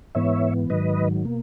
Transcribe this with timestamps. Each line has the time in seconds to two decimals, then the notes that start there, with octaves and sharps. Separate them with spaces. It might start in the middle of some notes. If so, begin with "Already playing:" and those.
0.15 G#2 E3 B3 C#5 E5
0.70 G#2 D#3 F#3 B4 D#5
1.25 B2 A#3